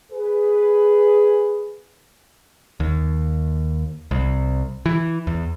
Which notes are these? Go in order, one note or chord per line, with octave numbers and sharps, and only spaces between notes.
G#4 B4
D#2
C2
E3
E2